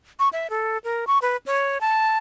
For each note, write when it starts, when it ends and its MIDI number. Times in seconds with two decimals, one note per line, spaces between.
0.19 0.29 85
0.33 0.50 76
0.50 0.78 69
0.84 1.05 70
1.07 1.19 85
1.22 1.37 71
1.46 1.78 73
1.81 2.18 81